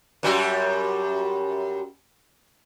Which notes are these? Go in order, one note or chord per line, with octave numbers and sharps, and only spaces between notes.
F#2 G3 F#4